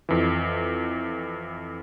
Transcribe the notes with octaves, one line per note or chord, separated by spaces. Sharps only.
F2 E3